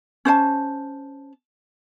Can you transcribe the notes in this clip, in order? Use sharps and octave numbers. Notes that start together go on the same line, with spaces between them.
C#4 C5 D5 A5